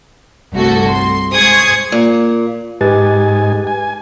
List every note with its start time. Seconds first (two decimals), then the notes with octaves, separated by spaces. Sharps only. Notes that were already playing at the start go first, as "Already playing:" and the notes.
0.54 G1 C2 A3 F#4 A4
0.88 C6
1.32 G#2 G#4 C5 C#6 D#6 G#6
1.92 A#2
2.81 G#2 D#4 G4 B4 G#5 A6
3.67 G#5